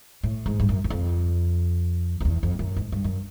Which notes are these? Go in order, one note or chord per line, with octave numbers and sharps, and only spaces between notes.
A2
G#2
G2
F#2
F#2
F2
F2
E2
F2
F#2
G#2
G2
F#2